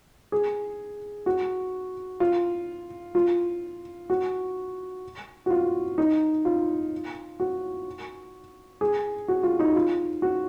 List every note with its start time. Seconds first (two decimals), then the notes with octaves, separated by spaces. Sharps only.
0.32 G#4
1.26 F#4
2.20 F4
3.15 F4
4.10 F#4
5.46 F#4
5.50 F4
5.98 D#4
6.45 F4
7.40 F#4
8.81 G#4
9.28 F#4
9.43 F4
9.59 D#4
9.75 F4
10.22 F#4